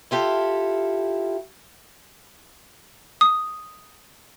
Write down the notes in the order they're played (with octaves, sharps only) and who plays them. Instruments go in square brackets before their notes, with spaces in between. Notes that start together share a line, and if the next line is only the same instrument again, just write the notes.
[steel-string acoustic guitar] E4 F4 G4 A4
[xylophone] D#6